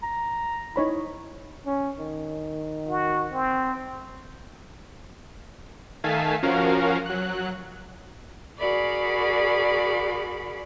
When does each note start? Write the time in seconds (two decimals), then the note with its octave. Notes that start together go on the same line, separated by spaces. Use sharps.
0.03 A#5
0.76 D#4 E4 C#5 B5
1.66 C#4
1.99 D#3
2.89 F#4
3.32 C4
6.04 D#3 A3 F5 G#5 A5 B6
6.43 F3 C#4 F#4 A#4 F5
7.06 F#3 F#6
8.60 F#4 G#4 A#4 D5 B5